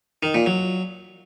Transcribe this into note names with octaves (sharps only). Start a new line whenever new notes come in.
D#3
A#2
F#3